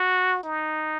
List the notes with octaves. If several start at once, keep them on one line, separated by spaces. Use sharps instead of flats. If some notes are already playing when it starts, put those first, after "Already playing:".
Already playing: F#4
D#4